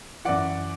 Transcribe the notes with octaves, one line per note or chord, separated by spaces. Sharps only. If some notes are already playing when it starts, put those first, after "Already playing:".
F#2 E3 D5 F#5